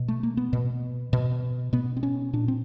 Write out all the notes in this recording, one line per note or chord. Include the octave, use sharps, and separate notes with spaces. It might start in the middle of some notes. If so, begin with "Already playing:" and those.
Already playing: B2
A3
A#3
B3
B2
B2
B2 B3
C4
C#4
A#2 D4
C4